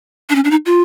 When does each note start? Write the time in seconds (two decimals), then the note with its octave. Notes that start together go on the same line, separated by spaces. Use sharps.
0.30 D4
0.35 C#4
0.44 D4
0.51 D#4
0.66 F4